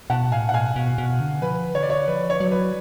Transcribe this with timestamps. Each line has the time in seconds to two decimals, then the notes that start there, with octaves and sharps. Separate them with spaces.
0.10 B2 F#5 A5
0.32 A2 F5 G#5
0.49 F#5
0.53 B2 F5 G#5
0.76 B2
0.98 B2
1.20 D3
1.42 F3 B4
1.74 D3 C#5
1.83 D5
1.90 C#5
2.08 F3 B4
2.30 C#5
2.40 F#3
2.52 B4